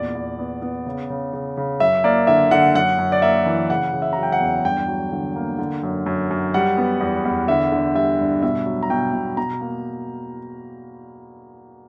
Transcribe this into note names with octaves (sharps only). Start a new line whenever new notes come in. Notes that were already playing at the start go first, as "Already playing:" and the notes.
Already playing: E2 A#2 D5
E2
B3
B3
C#3
C#3
C#3
C#3
F#2 E5
A#3 D5
D3 E5
D3 F#5
F#2 F#5
F#2
D5
A#3 E5
E3
C#3 F#5
C#3
E5
F#3 A#5
G5
F#5
E2
G2 G5
F#3
D3
A#3
D3
F#2
F#2
F#2
G3 F#5
B3
E2
E2
D3 E5
D3
G3 E5
G2
B2 E5
F#3
A#5
B2 G5
B2
B2 A#5
A#3